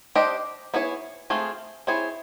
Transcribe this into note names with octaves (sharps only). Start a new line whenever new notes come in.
D4 G4 C5 D#5
B3 E4 G#4 C#5
A3 C4 F4 G#4
C4 E4 G#4 C#5